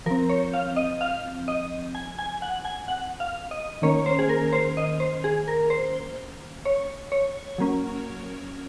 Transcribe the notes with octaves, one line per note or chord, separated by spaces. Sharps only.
F3 C4 A#4
C#5
F5
D#5
F5
D#5
G#5
G#5
F#5
G#5
F#5
F5
D#5
D#3 A#3 C#4 C#5
C5
G#4
A#4
C5
D#5
C5
G#4
A#4
C5
C#5
C#5
F#3 A#3 C#4